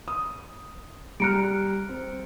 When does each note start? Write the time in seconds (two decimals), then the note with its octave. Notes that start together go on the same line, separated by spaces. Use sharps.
0.08 D#6
1.20 G3 A#5 F6 F#6 C#7 D7
1.89 C4